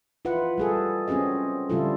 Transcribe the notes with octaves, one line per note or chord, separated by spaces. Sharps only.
E4 F4 B4 F#5
G3 G#4 A4
C4 C#4 F#4 G#4 D#5
D3 G3 E4 F4 A4